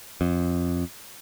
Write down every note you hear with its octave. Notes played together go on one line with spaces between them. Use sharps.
F2